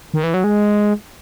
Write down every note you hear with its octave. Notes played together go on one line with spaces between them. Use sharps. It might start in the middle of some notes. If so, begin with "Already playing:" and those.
D#3
E3
F#3
G#3